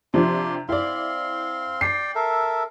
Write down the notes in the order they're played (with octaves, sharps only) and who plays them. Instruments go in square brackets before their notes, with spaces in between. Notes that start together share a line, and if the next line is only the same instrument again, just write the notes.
[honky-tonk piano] C3 F3 D4 [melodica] F4 G4 C6
[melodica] C4 F5 C6 [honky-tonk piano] E4 D5
[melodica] D5 G5 [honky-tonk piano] C7
[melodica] A4 A#4 E5